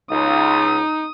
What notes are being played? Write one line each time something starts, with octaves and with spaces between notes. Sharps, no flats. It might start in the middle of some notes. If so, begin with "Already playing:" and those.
C#2 D#4 D#6